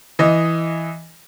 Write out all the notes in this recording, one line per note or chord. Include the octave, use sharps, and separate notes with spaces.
E3 D#5